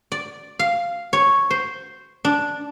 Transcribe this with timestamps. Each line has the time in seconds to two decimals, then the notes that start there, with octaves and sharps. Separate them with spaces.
0.12 D5
0.59 F5
1.13 C#5
1.50 C5
2.25 D4